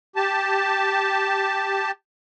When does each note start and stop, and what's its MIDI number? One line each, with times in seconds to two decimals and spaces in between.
0.16 1.91 67
0.16 1.91 81